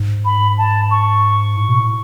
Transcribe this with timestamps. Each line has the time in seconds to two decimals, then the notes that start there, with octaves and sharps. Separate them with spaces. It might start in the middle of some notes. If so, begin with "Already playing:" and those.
Already playing: G#2
0.25 B5
0.58 A5
0.91 C#6
1.56 A2
1.68 B2
1.80 A2